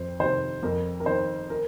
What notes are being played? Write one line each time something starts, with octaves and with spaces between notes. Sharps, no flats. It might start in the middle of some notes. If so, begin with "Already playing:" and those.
Already playing: F2 C5
C3 D#3 C5
F2 A#4
A#4
D#3 C5
A#4